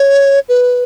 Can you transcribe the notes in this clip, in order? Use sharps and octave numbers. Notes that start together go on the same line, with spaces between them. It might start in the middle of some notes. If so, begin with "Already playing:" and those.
Already playing: C#5
B4